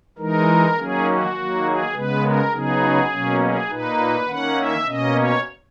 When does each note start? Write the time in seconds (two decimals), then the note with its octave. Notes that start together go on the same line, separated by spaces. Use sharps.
0.18 E3 G#3 D#4 A#4
0.77 D#3 F#3 A#3 C#4 G#4
1.06 F#4
1.35 D#3 F#3 A#3
1.64 G#4
1.93 C#3 G#3 B3 B4
2.22 A#4
2.52 C#3 F#3 B3 D#4 G#4
3.10 B2 F#3 A#3 C#4
3.40 G#4
3.69 A#2 A#3 D#4 B4
4.27 D#3 A#3 C#4 F#5
4.57 E5
4.86 B2 A#3 C#4 D#5
5.15 C#5